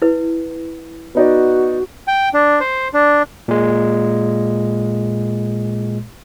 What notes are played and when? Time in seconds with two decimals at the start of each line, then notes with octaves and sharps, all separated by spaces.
0.02 E4 B4
1.15 B3 D#4 F#4 D5
2.08 G5
2.34 D4
2.60 C5
2.94 D4
3.48 A#2 G#3